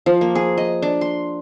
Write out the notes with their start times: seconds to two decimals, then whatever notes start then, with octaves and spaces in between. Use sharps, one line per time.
0.06 F3
0.21 A#3
0.35 G#4
0.58 D#5
0.82 D4
1.01 C6